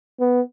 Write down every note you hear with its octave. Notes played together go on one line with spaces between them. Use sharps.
B3